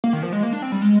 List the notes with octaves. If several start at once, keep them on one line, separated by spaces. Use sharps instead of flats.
A#3
D#3
F3
G#3
A#3
D4
C4
G3
G#3